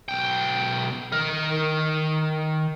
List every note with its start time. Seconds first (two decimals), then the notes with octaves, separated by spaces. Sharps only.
0.09 B1 G5
1.12 D#3 A#4